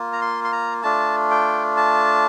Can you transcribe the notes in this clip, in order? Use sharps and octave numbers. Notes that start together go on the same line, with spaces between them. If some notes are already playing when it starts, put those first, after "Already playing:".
Already playing: A#3 F4
A#5
C6
C6
A#5
A3 D4 F4 A5
G5
A5